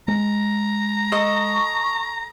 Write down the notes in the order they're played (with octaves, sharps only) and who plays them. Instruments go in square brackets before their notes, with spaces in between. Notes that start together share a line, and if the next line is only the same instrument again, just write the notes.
[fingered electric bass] G#3 [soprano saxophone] A#5
[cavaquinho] A4 D#5 [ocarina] C#6